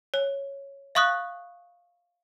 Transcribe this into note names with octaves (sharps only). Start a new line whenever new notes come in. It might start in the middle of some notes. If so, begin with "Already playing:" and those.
C#5
E5 F5 C#6 D#6 F#6